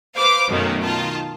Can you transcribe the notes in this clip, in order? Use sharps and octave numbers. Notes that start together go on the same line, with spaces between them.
B4 C5 F5 D6
F#2 B2 D#3 A3 A#3 C#4
D#3 F4 A5